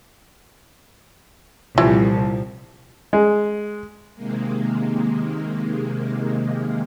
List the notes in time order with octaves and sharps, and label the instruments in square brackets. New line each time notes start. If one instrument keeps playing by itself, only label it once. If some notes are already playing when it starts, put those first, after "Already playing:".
[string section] C2 [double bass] A#2 [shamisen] E3 [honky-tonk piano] F3
[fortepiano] G#3
[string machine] C3 D#3 G#3 A#3